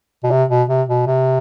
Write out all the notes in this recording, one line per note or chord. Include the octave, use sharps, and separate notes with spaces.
B2
C3
B2
C3
B2
C3